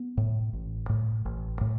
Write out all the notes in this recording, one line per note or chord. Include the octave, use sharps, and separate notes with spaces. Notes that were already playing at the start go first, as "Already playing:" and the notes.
Already playing: B3
A2
A1
A2
A1
A2